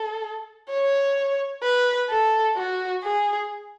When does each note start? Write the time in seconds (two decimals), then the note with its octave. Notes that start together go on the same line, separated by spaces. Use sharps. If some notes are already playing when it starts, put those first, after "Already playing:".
Already playing: A4
0.69 C#5
1.63 B4
2.10 A4
2.57 F#4
3.03 G#4